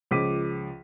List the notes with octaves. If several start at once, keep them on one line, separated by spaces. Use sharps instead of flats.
C#2 F3 D6 B6 D#7